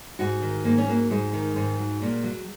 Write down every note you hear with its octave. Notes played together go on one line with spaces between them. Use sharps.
G#2 F#4
D#3
G#2 A#3
C#4
F#3 A#3
G#2 G#3
D#3
G#2
F#3
A#2
F#3